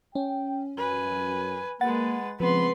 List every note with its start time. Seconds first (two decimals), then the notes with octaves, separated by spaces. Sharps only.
0.15 C#4 G5
0.78 F#2 B4 G#5
1.81 G#3 A#3 B4 F#5 A6
2.40 C#3 F3 G#3 B3 C4 B4 C6